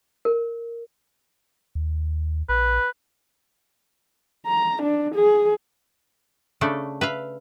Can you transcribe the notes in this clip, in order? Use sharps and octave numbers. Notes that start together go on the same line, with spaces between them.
A#4
D#2
A#1 B4
A#5
D4
G#4
C#3 A3 D4 A4
B4 E5 F5